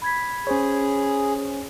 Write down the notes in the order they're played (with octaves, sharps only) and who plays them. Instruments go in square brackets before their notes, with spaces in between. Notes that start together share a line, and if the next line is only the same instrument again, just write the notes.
[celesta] B5 G#6 B6
[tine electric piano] C#4 C5 C#5 [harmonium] G#4